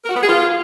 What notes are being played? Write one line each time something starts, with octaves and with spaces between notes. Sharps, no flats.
A#4
F#4
B3
G#4
F4